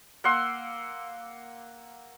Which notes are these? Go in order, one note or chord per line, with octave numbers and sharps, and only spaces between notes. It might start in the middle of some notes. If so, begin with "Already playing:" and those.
A#3 F#5 C6 E6